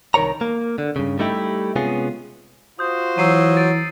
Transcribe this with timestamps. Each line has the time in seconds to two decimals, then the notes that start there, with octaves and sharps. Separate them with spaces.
0.14 C2 D#3 A#4 C#5 A#5
0.41 A#3
0.78 D3
0.96 G2 C#3
1.19 G3 A3 D#4 E4 G4
1.76 C3 G#3 B3 C#4 F4 G#4
2.79 F4 F#4 C5 D#6 G6
3.18 E3 F#3 E6 C7 D#7
3.57 A6 D7 D#7